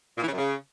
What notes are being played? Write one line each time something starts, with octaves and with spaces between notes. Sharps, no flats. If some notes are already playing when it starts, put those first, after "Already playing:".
A#2
E3
C#3
F#2
C#3